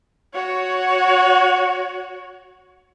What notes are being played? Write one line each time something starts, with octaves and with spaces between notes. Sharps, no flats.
F#4 C#5